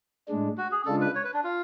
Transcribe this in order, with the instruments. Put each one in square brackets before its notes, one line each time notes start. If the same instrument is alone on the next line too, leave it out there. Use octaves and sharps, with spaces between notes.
[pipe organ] A2 G#3 D4
[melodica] F#4
G#4
[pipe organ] C#3 G#3 D4 F4 [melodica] A4
[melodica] B4
C#5
B4
D4
F4